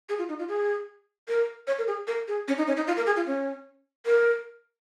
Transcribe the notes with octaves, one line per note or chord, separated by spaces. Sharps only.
G#4
F4
D#4
F4
G#4
A#4
C#5
A#4
G#4
A#4
G#4
C#4
D#4
C#4
D#4
F4
A#4
G#4
F4
C#4
A#4